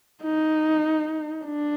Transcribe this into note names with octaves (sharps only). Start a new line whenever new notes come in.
D#4
D4